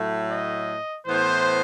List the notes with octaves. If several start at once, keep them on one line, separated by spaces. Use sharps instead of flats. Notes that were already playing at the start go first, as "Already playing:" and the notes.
Already playing: A2 F#3 A3
D#5
A2 E3 B3 C5